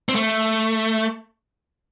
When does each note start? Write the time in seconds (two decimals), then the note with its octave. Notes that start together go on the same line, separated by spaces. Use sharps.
0.09 C4
0.15 A3